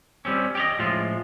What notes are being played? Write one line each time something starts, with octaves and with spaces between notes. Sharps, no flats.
G3 C4 C#4
G4 C#5 D#5
A2 F3 G#3 F4